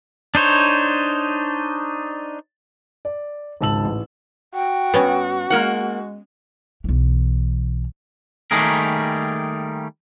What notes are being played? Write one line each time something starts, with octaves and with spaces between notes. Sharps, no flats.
D4 D#4 C5 C#5
D5
G#1 C#2 A5 E6 F#7
A1
F#4 G5
G2 B3 C#4
G#3 A#3 A#4 F#5
B1 E3
D#3 G3 A3 A#3 G#4 A#4